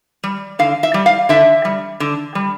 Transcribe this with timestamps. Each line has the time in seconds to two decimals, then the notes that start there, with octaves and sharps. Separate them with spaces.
0.24 G3
0.59 D3 F5
0.83 E5
0.94 G3
1.06 F5
1.29 D3 E5
1.65 G3
2.00 D3
2.35 G3